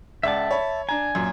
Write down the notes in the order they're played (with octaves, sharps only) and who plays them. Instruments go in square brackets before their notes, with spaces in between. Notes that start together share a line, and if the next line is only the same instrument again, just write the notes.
[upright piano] C#2 D5 F#5 [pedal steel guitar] E5 A5
[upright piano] C#5 B5
[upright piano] D4 A#5 [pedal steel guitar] G#5
[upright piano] F#2 A#2